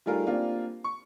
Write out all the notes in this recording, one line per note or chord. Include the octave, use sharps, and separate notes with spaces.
G3 A3 D#4 F4 G#4 A#4
G3 A#3 C4 D4 F4
C#6